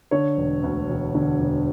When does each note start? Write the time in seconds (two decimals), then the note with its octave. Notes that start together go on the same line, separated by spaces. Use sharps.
0.11 D3 C#5
0.37 E1
0.63 D2
0.89 E1
1.15 D3
1.39 E1